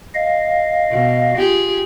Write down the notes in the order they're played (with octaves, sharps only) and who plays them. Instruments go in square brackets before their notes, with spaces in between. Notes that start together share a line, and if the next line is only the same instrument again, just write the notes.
[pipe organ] D#5 F5
[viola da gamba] B2
F4 G4 G#4